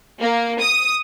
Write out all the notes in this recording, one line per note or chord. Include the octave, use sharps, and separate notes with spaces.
A#3
D#6